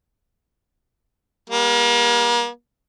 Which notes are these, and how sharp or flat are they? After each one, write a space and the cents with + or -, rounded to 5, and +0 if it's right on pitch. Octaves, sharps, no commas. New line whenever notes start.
G3 +30 A#3 +40